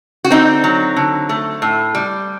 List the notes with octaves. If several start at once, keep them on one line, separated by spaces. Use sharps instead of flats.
F#4
D3 C4 D#4
F#3
D3
A3
A2
G3